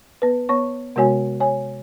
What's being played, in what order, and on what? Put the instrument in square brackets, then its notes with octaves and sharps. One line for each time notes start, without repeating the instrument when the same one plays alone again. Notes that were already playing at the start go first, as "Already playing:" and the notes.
[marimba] B3 B4
B3 C#5 C#6
C3 G#3 B3 F#4 C#5 G#5
C#5 G#5